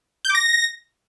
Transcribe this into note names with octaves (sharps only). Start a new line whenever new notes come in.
G6
D6
A#6